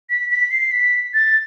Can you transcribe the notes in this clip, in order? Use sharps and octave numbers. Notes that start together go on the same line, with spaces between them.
B6
B6
C7
B6
A6